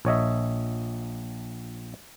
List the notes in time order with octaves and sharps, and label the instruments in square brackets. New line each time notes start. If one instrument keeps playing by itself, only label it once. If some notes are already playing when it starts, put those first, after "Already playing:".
[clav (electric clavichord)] A#1 C#5 D#5 E5